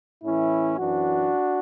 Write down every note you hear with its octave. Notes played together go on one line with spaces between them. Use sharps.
A2 E3 C#4 E4
F#2 E3 D4 F#4